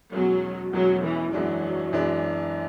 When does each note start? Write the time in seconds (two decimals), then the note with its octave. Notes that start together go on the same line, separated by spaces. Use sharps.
0.13 E2 B2 F#3 G#3 C#4
0.73 E2 B2 F#3 G#3 C#4
1.04 E3
1.33 F#2 E3 F#3 G#3 D4
1.93 F#2 E3 G#3 D4